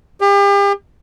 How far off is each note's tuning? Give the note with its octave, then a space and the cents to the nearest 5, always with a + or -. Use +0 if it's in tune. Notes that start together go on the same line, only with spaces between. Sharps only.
G4 +40